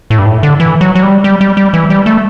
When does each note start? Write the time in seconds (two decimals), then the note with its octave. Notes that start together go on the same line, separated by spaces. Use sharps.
0.10 A2
0.19 G2
0.26 A2
0.43 D3
0.60 E3
0.81 F#3
0.95 F#3
1.03 G3
1.24 G3
1.41 G3
1.57 G3
1.74 E3
1.90 G3
2.06 A3